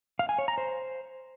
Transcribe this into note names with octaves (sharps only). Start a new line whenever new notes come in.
F5
G#5
C#5
A#5
C5